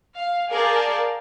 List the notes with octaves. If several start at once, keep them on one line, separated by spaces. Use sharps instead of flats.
F5
G#4 A#4 D5 F5 G5 A5